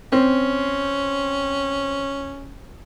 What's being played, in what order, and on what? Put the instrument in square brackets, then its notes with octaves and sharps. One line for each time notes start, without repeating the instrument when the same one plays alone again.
[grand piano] C4 [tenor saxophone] C#4